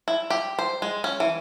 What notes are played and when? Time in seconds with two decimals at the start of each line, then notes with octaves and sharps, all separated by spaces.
0.08 E4
0.30 G4
0.59 C5
0.82 G#3
1.04 C#4
1.20 E3